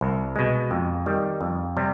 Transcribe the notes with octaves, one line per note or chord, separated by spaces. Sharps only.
C2
B2 G#3
F2
D#3 G3
F2
C3 G3